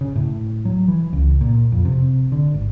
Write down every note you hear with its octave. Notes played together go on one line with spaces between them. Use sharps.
C#3
A2
F#3
E3
C#2
A#2
F2
C3
D3
G#1